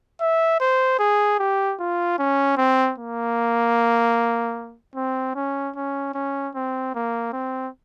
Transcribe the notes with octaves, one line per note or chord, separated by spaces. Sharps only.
E5
C5
G#4
G4
F4
C#4
C4
A#3
C4
C#4
C#4
C#4
C4
A#3
C4